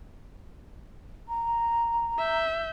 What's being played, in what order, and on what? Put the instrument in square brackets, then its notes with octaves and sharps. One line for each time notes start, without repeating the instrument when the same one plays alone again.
[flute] A#5
[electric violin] E5 G6